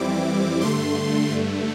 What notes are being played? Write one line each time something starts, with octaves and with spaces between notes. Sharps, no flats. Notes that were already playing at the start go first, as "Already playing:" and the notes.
Already playing: F2 E3 G3 C4 E4 D6
G2 D3 A3 C6